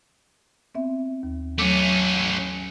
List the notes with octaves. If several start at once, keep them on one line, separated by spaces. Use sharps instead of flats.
B3 C4 E5
D#2
F#3 A3 C#4 D6